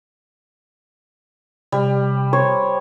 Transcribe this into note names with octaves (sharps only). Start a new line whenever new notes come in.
C3 G3
C5 C#5